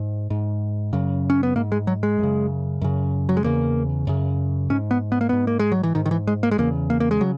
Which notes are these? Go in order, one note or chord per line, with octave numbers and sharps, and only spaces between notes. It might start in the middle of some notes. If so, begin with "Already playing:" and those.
Already playing: G#2
G#2
F#2 C#3
C#4
B3
G#2 A#3
G#3
F#3
G#3
F#2 C#3
F#2 C#3
F#3
G#3
E2 C#3 A#3
F#2 C#3
G#2 C#4
B3
B3
A#3
G#2 B3
A#3
G#3
F#3
E3
G#2 D#3
D#3
E3
G#3
A#3
G#3
E2 C#3 A#3
A#3
A#3
G#3
C#3 F#3